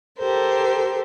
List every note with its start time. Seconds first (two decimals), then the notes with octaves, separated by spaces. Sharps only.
0.18 G4 A4 A#4 C5